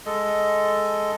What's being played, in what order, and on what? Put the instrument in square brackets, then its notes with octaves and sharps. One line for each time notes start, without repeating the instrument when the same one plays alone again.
[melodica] G#3 A4 D#5